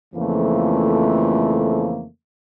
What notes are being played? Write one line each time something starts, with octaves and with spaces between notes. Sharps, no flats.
F2 C#3 E3 F3 A3 A#3